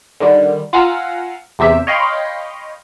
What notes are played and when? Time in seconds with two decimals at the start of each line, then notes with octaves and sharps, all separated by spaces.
0.20 D3 D#3 G3
0.73 F4 F5 F#5 G#5 A#5 E6
1.59 E2 C3 G4 E5
1.87 C#5 D#5 F5 G5 B5 C6